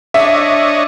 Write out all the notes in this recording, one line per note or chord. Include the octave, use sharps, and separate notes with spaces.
D4 C#5 D#5 E5